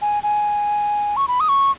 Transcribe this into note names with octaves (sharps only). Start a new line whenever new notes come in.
G#5
G#5
C#6
B5
D#6
C#6